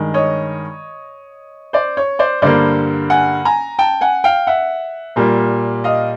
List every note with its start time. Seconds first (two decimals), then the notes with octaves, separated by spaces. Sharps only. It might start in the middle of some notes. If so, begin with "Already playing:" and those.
Already playing: G2 D#3 G#3
0.14 C#5 D#5
1.73 C5 D5
1.97 C#5
2.19 C5 D5
2.42 G2 D3 G3 A#3 C5 D5
3.10 F#5 G#5
3.45 G#5 A#5
3.79 G5 A5
4.01 F#5 G#5
4.24 F5 G5
4.47 E5 F#5
5.16 A#2 G3 A#3
5.84 D#5 F5